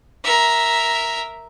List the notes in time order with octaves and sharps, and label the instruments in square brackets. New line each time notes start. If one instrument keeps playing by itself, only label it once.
[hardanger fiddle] A#4 E5